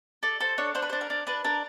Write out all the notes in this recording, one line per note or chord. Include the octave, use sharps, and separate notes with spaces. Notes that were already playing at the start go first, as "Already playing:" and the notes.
A4 D5
A4 C5
D4 C#5
D4 C5
B4
D4 C5
A#4
D4
D4 B4
D4 A#4